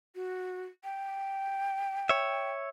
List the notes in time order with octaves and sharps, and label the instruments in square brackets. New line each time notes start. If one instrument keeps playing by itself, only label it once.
[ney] F#4
G5
[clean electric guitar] C#5 E5